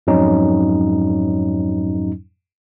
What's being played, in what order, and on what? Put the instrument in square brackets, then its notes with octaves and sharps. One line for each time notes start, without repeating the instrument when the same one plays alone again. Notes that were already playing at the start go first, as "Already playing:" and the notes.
[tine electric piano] F2 G#2 F#3 C#4 D#4